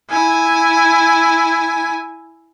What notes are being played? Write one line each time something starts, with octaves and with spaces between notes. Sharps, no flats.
E4 G#5